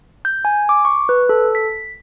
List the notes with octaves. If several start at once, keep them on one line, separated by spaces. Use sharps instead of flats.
G6
G#5
D6
C#6
B4
A4
B6